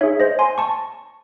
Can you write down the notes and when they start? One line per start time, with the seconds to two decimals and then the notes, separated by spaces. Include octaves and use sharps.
0.01 D#4 G#4 C#5 E5
0.20 C5 D#5
0.39 G#5 C6
0.58 A5 C#6